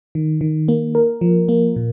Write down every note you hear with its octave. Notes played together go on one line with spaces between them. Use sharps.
D#3
D#3
A#3
A#4
F3
A#3
A#2